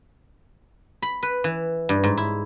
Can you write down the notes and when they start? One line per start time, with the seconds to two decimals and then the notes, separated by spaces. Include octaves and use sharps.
1.02 B5
1.23 B4
1.44 E3
1.89 G2
2.04 G#2
2.17 E4